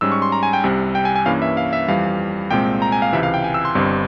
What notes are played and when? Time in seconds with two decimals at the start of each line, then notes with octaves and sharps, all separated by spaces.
0.01 G#2 G3 C#4 E6
0.12 C#6
0.22 C6
0.32 A#5
0.43 G#5
0.53 G5
0.64 C2 C3 G3
0.95 G5
1.05 G#5
1.16 G#5
1.26 G2 E3 A#3 C#4 F5
1.42 E5
1.57 F5
1.73 E5
1.88 F2 E3 G3 F5
2.51 C2 A#2 G#3 C4 G5
2.82 A#5
2.92 G#5
3.02 F5
3.13 C#2 C3 E3 E5
3.23 F5
3.34 G5
3.44 G#5
3.54 E6
3.65 C6
3.75 G1 G2 G3 C4